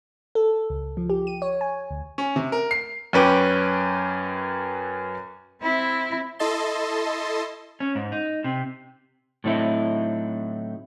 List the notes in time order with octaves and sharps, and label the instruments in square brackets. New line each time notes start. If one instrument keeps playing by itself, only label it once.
[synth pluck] A4
C#2
F3
G4
D#7
C#5
G#5
D2
[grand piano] C#4
C3
A#4
C7
F#2 C#4 B4 G5 D6
[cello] C4 E4
[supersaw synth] E4 A4 D#5 A5 C6
[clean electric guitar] C#4
G#2
D#4
C3
[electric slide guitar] A2 D3 F#3 C4 D#4 E4